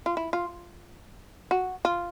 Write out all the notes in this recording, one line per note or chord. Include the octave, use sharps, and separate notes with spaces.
F4
E4
F4
F#4
F4